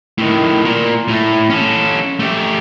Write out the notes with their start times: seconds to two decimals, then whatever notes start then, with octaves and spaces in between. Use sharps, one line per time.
0.18 A2 D#3
0.65 A#2
1.08 A2 A3
1.50 C#4 A4
2.19 A3 G4